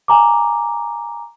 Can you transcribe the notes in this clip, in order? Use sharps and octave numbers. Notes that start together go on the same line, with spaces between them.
G#5 A#5 D6